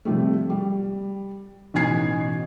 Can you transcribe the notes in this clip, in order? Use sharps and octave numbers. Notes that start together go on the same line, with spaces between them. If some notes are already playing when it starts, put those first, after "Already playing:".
C3 F3 G3 A3
G3
A1 B2 D#4 G#5 G#6 C7